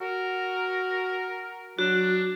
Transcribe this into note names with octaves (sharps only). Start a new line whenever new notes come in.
F#4 A#4
F#3 D4 F#4